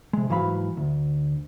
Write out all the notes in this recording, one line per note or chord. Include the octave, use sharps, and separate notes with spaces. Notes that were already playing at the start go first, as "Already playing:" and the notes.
C3 G#3
G#2 E3 F#3 F5 B5
D2